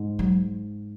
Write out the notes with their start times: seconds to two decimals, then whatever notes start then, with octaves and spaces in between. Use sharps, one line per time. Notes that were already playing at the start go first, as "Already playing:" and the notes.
Already playing: G#2
0.19 F#3